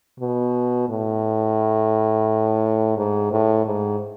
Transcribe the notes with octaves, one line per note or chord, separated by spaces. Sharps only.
B2
A2
G#2
A2
G#2